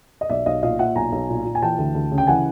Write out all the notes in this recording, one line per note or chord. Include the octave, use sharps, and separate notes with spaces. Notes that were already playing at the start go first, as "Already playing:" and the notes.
D#5
B1 D5 E5
B1 D#5 F5
A#2 D#5 F5
A#2 E5 F#5
B1 G#5 A#5
B1
A#2
A#2
G#5
E3 G5 A5
D2
D2
C#3
G5
E3 F#5 G#5